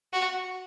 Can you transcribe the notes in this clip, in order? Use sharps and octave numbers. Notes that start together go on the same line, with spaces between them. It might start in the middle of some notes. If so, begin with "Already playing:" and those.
F#4